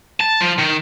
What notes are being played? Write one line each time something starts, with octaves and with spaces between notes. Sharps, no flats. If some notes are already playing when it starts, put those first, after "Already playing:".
A5
F3
D#3